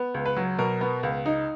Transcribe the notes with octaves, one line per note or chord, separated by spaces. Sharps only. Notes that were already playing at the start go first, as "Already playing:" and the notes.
Already playing: B3
C#2
B4
F#3
B2 A#4
B3
C#2
D#4